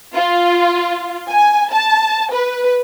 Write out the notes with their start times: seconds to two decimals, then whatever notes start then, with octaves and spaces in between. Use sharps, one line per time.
0.15 F4
1.29 G#5
1.72 A5
2.32 B4